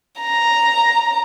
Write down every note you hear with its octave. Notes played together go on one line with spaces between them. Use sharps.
A#5